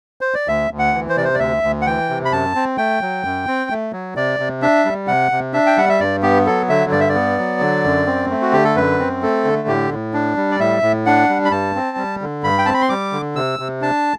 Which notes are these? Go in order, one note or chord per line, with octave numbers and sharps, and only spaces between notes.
C5
D5
D2 E5
D2
F#5
E3
C5
C3 D5
C5
D5
D2 E5
D2
F#5
E3 G5
C3
B5
F#2 A5
C4
A3 G5
F#3
F#2
C4
A3
F#3
C3 D5
C3
D4 E5
G3
C3 F#5
C3
D4 E5
G5
G3 F#5
E5
G2 D5
B3 G4
F#3 A4
D3 E5
G2 D5
E5
D5
B3
F#3
D3
F#2
C4
A3
F#4
D3 G4
A4
F#2 B4
C4
A3 A4
D3
A2 G4
A2
D4
G3
D5
A2 E5
A2
D4 F#5
G3
B5
G2 A5
C4
G3
D3
G2 B5
G5
C4 A5
B5
C6
G3 D6
D3
C3 E6
C3
D4 A5